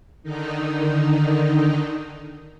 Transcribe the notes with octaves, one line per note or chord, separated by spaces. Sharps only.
D3 D#3 D#4